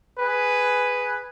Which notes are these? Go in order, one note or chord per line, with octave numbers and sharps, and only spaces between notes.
G#4 B4